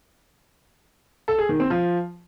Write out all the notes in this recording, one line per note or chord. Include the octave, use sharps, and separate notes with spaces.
A4
G#4
D#3
C4
F3